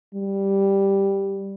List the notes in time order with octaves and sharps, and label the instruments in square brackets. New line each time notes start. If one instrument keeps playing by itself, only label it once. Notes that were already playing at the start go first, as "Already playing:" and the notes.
[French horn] G3